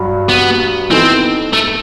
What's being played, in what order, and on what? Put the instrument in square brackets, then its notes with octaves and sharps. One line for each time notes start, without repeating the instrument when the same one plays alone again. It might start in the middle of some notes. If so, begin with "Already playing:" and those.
Already playing: [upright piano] G2 F#3
[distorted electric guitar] B3
[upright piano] E3 B3 D#4 A4 [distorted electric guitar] C4
[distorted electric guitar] A3